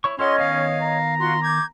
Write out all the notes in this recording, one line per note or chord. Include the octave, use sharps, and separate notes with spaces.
E4 C#5 C#6
C#4 F4 A4 C#5 D#5 F#5 C6
D#3 B3 F5
A#5
F4 F#4 C6
D6 G6 G#6